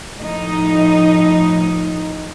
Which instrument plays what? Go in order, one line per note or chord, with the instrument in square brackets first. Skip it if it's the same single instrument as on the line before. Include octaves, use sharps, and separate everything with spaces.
[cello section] A2 F3 D#4